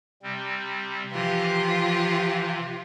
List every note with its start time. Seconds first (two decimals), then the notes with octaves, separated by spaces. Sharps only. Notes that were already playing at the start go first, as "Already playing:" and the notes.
0.23 C3 G3 C4
1.12 C3 E3 F3 F4 G4